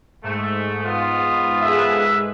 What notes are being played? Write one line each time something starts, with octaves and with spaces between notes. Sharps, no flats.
G#2 A3
B3 F4
G#4 A4 B4 E5